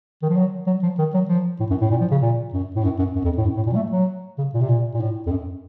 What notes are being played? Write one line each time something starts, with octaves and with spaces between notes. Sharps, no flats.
D#3
F3
F#3
F#3
F3
D#3
F#3
F3
A2
F#2
A2
A#2
F3
C#3
A#2
F#2
A2
F#2
F#2
F#2
F2
A2
F#2
A2
A#2
F#3
A3
F#3
C#3
A#2
C3
A#2
A#2
A2
F2
F#2